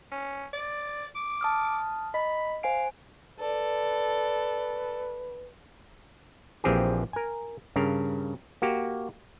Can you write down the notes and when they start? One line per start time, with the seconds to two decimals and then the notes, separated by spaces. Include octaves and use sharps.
0.12 C#4
0.53 D5
1.15 D6
1.41 A5 D#6 F6
2.14 D#5 B5
2.63 C5 F5 G#5 D7
3.39 A4 B4 D5
6.64 A#1 E3 F3 C4 G4 G#4
7.13 A#4 G#5
7.76 G2 C#3 A#4
8.62 A#3 F#4 G4